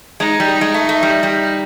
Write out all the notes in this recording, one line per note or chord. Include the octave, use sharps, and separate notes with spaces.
G#3 D#4
G3
G#3
A3
A3
G3
G3